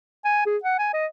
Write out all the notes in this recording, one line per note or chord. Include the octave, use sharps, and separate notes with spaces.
G#5
G#4
F#5
G#5
D#5